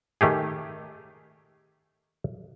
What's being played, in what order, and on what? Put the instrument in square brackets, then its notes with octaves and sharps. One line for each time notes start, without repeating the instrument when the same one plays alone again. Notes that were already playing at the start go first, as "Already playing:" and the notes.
[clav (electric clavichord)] D#3 A3 G4 G#4